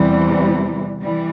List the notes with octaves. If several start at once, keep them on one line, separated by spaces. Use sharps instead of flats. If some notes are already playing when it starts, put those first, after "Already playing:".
Already playing: E2 C3 E3 G3
E3 G3